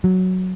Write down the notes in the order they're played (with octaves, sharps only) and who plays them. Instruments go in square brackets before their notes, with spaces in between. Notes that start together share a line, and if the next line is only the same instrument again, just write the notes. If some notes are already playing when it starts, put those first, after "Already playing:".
[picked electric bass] F#3